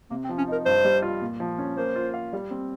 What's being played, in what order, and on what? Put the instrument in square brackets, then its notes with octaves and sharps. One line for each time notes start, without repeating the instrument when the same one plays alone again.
[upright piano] C3 [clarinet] A#3
[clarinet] C4
[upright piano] F3
[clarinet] C#4
[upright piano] D#4 [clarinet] A#4
[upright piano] G2 [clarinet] C5
[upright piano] G3
F4
A#2
F3
C#4
[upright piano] A#3 [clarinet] C5
[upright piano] F4
F5
G3
C4